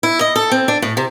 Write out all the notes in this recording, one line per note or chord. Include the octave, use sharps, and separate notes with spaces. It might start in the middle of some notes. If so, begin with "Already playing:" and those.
E4
D#5
A4
C4
D4
A2
C3